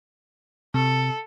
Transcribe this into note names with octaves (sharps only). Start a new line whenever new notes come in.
C3 A4